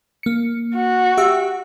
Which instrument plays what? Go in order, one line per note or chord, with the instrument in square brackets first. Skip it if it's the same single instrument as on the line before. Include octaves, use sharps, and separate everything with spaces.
[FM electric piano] A#3 C#7
[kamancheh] F#4
[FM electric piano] G4 E5 E6